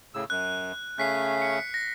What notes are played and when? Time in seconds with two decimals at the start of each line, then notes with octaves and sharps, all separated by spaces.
0.14 A2 C#3 E6
0.30 F#2 F#6
0.98 C#3 A3 C#4 F#6 B6 C7
1.42 C#7
1.74 A#6